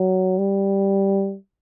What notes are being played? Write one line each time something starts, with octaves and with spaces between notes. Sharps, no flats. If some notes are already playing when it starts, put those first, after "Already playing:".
Already playing: F#3
G3